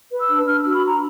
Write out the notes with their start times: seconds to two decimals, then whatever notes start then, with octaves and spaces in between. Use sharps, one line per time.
0.12 B4
0.20 E6
0.29 D4
0.48 D4 F6
0.61 F#4 E6
0.74 B5
0.83 D4 A#5